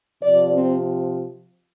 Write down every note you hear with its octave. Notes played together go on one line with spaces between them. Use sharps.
C3 F3 D5
C4